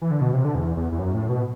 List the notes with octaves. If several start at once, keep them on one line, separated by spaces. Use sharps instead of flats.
E3
D3
B2
C3
D3
E2
E2
E2
F#2
A2
B2